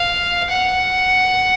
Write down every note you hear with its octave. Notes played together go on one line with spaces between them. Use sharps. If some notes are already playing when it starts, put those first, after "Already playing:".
Already playing: F5
F#5